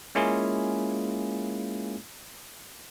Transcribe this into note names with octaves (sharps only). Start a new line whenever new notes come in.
G#3 A#3 C#4 E4 F4 G#4